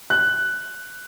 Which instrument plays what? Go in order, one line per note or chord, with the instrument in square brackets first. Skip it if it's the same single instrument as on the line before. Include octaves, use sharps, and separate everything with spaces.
[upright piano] F#6